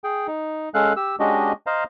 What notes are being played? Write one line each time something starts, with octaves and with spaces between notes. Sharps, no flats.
G#4 G5
D#4
G#3 C#4 A4 F5 F#6
G4 E6
G#3 C#4 D4 F#4 G4 D#5
C5 D#5 F5 A#5